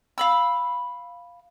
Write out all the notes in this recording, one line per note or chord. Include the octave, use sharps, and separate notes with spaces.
F5 B5 E6